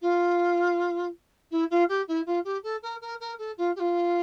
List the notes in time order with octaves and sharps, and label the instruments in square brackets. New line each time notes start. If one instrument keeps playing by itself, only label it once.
[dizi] F4
E4
F4
G4
E4
F4
G4
A4
A#4
A#4
A#4
A4
F4
G4
F4